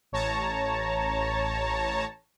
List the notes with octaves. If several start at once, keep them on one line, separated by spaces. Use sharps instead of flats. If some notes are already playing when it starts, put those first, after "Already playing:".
A1 C#5 A5 A#5